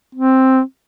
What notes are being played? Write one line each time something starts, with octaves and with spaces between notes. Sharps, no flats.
C4